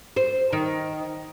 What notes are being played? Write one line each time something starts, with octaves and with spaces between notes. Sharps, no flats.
C5
D#3